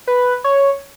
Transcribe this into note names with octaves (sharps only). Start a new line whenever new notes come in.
B4
C#5